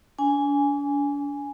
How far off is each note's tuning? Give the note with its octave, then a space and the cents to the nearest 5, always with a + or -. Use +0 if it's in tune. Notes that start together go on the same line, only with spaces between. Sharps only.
D4 -40 G#5 +0